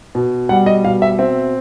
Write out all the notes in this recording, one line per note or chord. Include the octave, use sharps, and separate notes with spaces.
B2
G3 F#5
D#5
B2 F5
E5
C4 E5